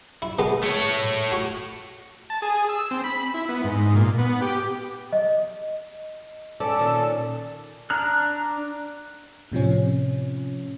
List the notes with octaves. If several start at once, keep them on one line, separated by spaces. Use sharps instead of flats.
E4
B2 G#3 B3
A3 C#5
F#4
A5
G#4
E6
C4
B5
E4
B3
G#2
A#2
B3
G4
D#5
C#4 A4 D5
A#2 D#3 C#4
D4 A#5 F6 F#6
A2 C3 F3 C#4